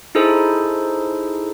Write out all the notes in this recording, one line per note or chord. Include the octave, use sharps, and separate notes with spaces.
D#4 E4 G#4 A4 C5